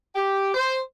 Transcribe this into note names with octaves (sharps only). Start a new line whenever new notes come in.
G4
C5